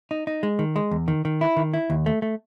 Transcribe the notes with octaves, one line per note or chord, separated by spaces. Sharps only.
D#4
D#4
G#3
D#3
G#3
E2
D#3
D#3
E4
D#3
E4
D#2
A3
A3